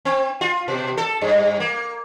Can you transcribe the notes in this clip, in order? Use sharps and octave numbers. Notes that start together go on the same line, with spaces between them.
C4
F4
B2
A4
G2
A#3